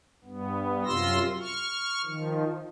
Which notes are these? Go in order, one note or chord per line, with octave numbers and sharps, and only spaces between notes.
G2 B3
F#2 C3 F4 C6 E6 A#6
C#6 F6
D#3 F3